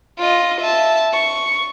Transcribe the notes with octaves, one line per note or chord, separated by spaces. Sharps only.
F4 D#5
E5 A5
C#6